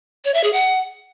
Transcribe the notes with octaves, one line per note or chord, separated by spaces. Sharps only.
C#5
E5
G#4
F#5